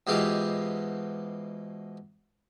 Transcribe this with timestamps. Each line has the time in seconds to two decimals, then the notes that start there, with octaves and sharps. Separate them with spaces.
0.07 G#2 B2 E3 G#3 F4 G4